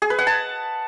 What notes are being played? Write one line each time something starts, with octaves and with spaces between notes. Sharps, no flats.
G#4
B4
F#5
A5